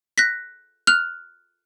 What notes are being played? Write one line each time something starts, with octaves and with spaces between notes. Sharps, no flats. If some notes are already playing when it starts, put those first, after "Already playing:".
F#6 A#6 B6
F6 F#6 F7